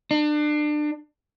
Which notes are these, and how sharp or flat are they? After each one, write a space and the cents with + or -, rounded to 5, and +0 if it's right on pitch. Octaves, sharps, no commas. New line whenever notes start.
D4 +30